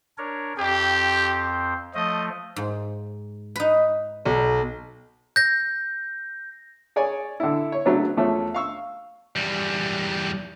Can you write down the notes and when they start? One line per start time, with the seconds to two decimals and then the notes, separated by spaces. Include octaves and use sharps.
0.18 D4 A#4 C#5
0.58 F2 C4 G4 C5
1.94 F3 A3 D#5
2.56 G#2
3.56 D#4 B4
4.25 B1
5.36 G6 A#6
6.96 G#4 C#5 D5 G#5
7.40 D3 E4
7.72 C#5
7.86 C#3 F#3 A3 B3 D4
8.17 E2 F3 A3 C#4
8.54 F5 C#6 E6
9.35 E2 G3